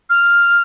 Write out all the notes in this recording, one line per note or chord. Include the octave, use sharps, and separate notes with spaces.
F6